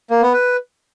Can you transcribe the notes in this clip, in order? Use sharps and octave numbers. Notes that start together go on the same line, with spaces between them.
A#3
B3
B4